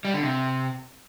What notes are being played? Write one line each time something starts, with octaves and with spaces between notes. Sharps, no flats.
G3
D3
C3